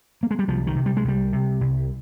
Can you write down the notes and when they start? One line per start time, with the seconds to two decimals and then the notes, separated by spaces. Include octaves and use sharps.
0.23 A#3
0.31 G#3
0.39 G3
0.48 C2 F3
0.67 D#3
0.76 C3
0.86 G3
0.97 G#3
1.05 C2 G3
1.33 C3
1.61 C2